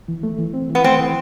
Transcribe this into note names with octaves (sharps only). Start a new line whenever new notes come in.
E3
A3
E3
C4
E3
B3
A3 C4
E3